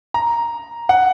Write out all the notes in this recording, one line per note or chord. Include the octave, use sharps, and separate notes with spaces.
A#5
F#5